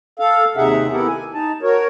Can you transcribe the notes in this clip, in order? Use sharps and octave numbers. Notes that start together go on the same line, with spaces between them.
A4 F5
D#2 C3 D#4 G#4 E5 F#5
B3 E4 G4 A4 A#4 F#5
G#5
D#4 A5
F#4 A#4 C#5